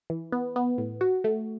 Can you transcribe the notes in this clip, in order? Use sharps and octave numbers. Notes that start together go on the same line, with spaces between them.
E3
B3
B3
A2
F#4
A3